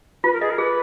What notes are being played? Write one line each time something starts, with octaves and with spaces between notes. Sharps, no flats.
F4 B4
A#4
G#4 D#5
A#4
G#4 B4